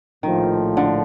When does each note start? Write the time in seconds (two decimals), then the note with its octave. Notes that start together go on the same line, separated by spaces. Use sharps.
0.23 A#1 A2 D#3 F3
0.77 D3